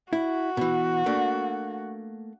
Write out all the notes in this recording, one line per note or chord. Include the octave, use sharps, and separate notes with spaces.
E4 F#4
B2 E3
A3 A#3 D4